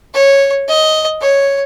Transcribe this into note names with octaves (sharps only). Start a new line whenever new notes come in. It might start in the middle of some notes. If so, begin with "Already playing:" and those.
C#5
D#5
C#5